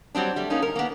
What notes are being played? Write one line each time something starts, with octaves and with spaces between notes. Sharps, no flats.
F#3 G3 C4 D4
G3 A3
G#3 A#3 C#4 D#4
A#4
A#3 B3